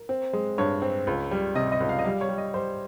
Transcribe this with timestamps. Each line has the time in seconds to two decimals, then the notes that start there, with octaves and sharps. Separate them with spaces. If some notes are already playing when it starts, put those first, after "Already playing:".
Already playing: A#4
0.09 C4
0.33 G#3
0.58 G2 C#5
0.82 C4
1.07 C#2
1.31 G3
1.55 C3 D#5
1.72 D#5
1.80 C#2
1.89 F5
1.99 D#5
2.05 G3 F5
2.21 C#5
2.29 G3
2.38 D#5
2.54 G3 C5